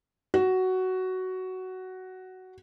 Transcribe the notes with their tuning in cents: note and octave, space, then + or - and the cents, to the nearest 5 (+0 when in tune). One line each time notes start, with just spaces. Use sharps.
F#4 +10